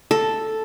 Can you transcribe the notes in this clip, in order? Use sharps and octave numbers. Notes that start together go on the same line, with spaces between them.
A4